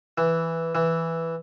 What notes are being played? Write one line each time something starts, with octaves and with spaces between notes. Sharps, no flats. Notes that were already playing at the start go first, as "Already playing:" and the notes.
E3
E3